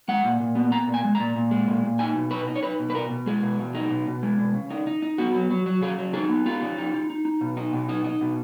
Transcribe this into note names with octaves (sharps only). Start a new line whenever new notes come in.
G#3 F#5
A#2
A#2
B3
B3 A#5
A#2
G#5
G#3
A#2 A#5
A#2
G#3
A#2
A#2
D#4 G#5
B2
D#4 B4
D#4
C#5
D#4 B4
B2
B4
B2 A#4
B2
G#3 G#4
B2
B2
D#4
B2
B2
G#3
B2
C#3
D#4
D#4
D#4
B3 F#4
F#3
F#3
F#3
C#3 G#4
F#3
D#4 G#4
B3
D#4 F4
C#3
D#4
D#4
D#4
D#4
B2
D#4
B2
D#4
D#4
B2